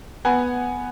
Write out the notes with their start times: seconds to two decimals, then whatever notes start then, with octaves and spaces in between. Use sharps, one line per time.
0.25 B3 F#5 G#5